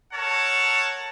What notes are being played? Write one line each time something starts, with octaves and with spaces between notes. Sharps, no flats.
A4 A#4 C#5 F#5 A5